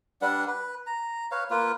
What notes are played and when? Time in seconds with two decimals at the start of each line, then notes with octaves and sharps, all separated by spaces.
0.22 G3 D4 B4 F#5
0.47 B4
0.87 A#5
1.31 B4 C#5 F5
1.50 A#3 F4 B4